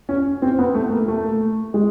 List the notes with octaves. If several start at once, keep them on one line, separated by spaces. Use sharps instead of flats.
C#4
C4
B3
A3
A#3
A3
G#3